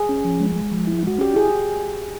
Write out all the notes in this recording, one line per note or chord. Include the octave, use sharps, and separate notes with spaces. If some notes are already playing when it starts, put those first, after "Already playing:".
Already playing: G#4
C#4
F3
G#3
G#3
F3
E4
G#3 F#4
C#4 G4
E4 G#4